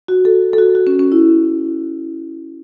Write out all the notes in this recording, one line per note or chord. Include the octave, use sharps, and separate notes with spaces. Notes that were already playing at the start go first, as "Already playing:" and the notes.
F#4
A4
A4
F#4
F#4
C#4
C#4
E4